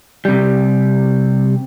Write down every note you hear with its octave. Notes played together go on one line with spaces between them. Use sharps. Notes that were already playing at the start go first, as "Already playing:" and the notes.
C3 G3